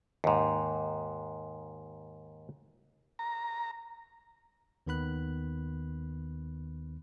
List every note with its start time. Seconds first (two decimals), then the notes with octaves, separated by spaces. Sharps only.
0.24 D#2 G#2
3.19 A#5
4.87 D#2 D#3 B3 B5 F#6